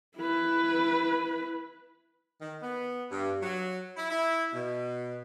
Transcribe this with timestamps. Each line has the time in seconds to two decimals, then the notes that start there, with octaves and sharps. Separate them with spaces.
0.16 E4 B4
2.42 D#3
2.63 B3
3.11 G2
3.43 F#3
3.97 E4
4.10 E4
4.53 B2